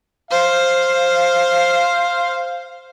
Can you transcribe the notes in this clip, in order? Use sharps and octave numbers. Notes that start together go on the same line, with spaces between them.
C5 F5